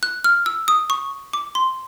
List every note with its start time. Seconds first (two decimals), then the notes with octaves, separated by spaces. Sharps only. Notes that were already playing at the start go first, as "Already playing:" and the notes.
0.03 F#6
0.24 F6
0.46 E6
0.68 D#6
0.90 C#6
1.33 D6
1.55 C6